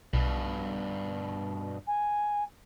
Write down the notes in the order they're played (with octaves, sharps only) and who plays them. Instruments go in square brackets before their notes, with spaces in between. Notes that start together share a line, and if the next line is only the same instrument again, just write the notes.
[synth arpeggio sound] B1 [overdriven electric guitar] G2 B2
[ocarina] G#5